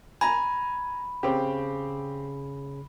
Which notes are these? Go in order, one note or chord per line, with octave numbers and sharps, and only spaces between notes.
G#5 A#5 B5
C#3 C4 G4